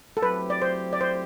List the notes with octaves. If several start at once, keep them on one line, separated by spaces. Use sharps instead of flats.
A4
F#3 A3 C4 E4 G4 B4
D5
C5
D5
C5